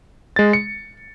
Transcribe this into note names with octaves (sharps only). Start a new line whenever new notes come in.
G#3 A6
C#7